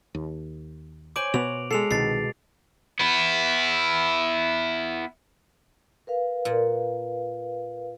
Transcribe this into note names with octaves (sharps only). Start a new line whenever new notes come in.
D#2
C5 C#5 G#5 D6 D7 F#7
B2 B3 F#4 F7
G#3 A4 C7 F7
C2 B2 D#3 A6 C7
B3 E4
A#4 B4 F5
A#2